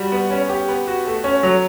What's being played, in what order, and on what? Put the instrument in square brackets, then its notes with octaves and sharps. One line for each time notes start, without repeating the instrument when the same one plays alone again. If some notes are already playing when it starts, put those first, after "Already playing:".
Already playing: [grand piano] G3 F#4
B3
C#4
G4
B3
F#4
A3
C#4
F#3